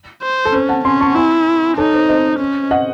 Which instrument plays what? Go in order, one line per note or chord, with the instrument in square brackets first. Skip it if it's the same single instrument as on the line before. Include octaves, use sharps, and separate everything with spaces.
[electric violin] C5
[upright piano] A4
[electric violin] C#4 [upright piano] C5
[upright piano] F#5 A5
[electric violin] C#4 [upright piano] G#5 C6
[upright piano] A5 C#6
[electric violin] E4 [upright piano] G#5 C6
[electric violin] D#4 [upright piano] A4 C#5
[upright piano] C5
C5 D#5
[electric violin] C#4
[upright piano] D#5 F#5